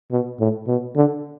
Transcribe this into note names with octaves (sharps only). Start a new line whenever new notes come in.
B2
A2
B2
D3